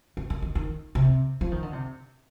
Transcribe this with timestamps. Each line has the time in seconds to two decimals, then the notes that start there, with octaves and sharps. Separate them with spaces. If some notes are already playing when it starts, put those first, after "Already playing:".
0.17 D#3
0.30 D#3
0.42 D#3
0.55 D#3
0.95 C3
1.41 F3
1.52 D#3
1.63 D3
1.73 C3